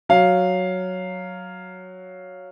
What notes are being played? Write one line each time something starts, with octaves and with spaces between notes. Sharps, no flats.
F#3 F5